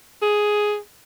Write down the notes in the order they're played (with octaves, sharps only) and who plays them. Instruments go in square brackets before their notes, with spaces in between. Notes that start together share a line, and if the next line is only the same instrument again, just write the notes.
[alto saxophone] G#4